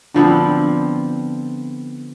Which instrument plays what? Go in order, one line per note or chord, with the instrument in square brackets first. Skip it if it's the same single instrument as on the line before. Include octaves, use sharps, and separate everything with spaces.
[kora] D3 F3 B3 C4